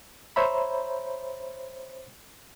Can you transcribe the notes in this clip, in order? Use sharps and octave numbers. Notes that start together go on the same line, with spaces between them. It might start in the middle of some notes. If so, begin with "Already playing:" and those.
C5 C#5 E5 A#5 B5